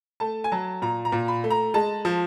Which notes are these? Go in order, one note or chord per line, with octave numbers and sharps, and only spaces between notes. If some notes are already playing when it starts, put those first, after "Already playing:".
A3 A5
G#5
F#3 A5
A#2 A#5
A#5
A#2
B5
A3
A#5
G#3 A5
F3